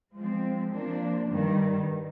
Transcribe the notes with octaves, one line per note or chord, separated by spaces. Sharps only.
F3 G#3 C4
F3 A#3 D4
G2 D#3 G3